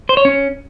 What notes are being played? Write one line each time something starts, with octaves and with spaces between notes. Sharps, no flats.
C5
C#5
C#4